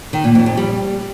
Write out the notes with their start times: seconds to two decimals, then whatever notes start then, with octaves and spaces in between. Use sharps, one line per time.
0.13 D#3
0.24 A#2
0.35 F2
0.46 F2
0.57 G3